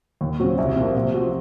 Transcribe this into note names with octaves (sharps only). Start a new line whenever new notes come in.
D#2
C#3 F#3 C4 F#4
C2
C3 F3 A#3
C3
F3 C4 F#4